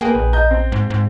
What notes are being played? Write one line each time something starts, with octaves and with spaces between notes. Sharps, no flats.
A#3 G#4 B4 G5
A#1
D#5 A#5 G6
C4
G#2
G#2